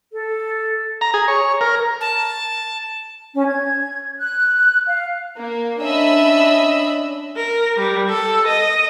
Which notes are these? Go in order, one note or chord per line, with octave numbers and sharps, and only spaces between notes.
A4
A#5
G#4
C#5
A#4
A5
C#4
G#6
F#6
F5
A#3
C#4 D4 D#5 E5 B5 E6
A#4
G3
A4
D#5